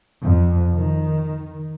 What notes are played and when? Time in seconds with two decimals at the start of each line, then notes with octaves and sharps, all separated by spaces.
0.24 F2
0.76 D#3